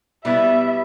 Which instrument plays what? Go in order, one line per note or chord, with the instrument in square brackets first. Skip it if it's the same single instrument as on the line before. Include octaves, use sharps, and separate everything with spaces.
[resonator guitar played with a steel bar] B2 G3 B3 E4 [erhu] E5